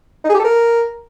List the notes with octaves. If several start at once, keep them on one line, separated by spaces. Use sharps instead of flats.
D#4
G#4
G4
A4
A#4